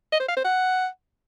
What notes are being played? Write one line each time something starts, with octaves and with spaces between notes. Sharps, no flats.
D#5
C5
F5
C5
F#5